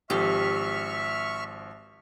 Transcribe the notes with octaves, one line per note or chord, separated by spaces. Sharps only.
G#1 F3 G4 E5 C#6 F6